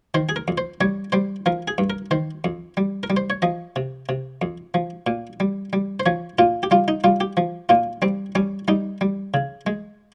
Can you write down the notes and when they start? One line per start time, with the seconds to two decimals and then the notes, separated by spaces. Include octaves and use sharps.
0.14 D#3 C5
0.29 G#4
0.36 A#4
0.48 F2
0.58 C5
0.81 G3 C#5
1.12 G3 C5
1.46 F3 A#4
1.68 G#4
1.78 G2
1.90 A#4
2.11 D#3 C5
2.44 F2
2.77 G3
3.03 A#4
3.10 G3
3.17 C5
3.30 C#5
3.42 F3 D#5
3.76 C3
4.09 C3
4.42 F2
4.74 F3
5.07 A#2
5.40 G3
5.73 G3
6.00 C5
6.06 F3 C#5
6.39 A#2 F4
6.63 G4
6.71 G3 F4
6.88 D#4
7.04 G3 F4
7.21 G4
7.37 F3
7.69 A#2 F4
8.02 G3 C4
8.35 G3 C#4
8.68 G3 D#4
9.01 G3
9.34 C#3
9.67 G#3